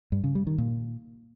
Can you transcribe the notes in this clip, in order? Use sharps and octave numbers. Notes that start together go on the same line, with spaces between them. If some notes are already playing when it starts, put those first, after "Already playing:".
G2
C#3
G3
D#3
A#2